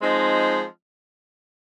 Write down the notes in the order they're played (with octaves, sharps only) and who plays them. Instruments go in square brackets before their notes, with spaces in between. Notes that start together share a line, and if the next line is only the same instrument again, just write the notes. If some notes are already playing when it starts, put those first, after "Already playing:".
[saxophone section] F3 G#3 C4 D#4